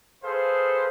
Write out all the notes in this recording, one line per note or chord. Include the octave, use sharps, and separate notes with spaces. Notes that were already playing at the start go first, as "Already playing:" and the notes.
G#4 A4 B4 C5 F5